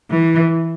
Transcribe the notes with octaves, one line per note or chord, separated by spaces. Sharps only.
E3